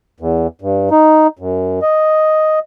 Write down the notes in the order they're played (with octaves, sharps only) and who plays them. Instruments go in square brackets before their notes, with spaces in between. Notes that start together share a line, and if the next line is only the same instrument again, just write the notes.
[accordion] E2
G2
D#4
F#2
D#5